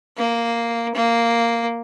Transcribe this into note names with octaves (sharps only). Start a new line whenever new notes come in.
A#3
A#3